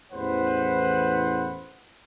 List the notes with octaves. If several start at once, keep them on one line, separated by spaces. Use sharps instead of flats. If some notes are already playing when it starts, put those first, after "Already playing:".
A1 E2 B4 C5 F#5